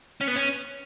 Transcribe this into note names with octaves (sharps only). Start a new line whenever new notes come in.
C#4
B3
C#4